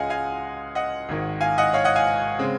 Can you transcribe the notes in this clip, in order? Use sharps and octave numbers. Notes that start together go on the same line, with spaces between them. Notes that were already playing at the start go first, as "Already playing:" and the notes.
Already playing: C#2 C#3 G#3 D#5 F5 F#5 G#5
F5 G#5
D#5 F#5
G#1 G#2 D#3
F5 G#5
D#5 F#5
C#5 F5
D#5 F#5
F5 G#5
C#3 G#3 C4